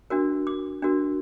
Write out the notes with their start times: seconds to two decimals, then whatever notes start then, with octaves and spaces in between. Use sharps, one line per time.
0.10 D4 F#4 A#4
0.47 D6
0.82 D4 F#4 A#4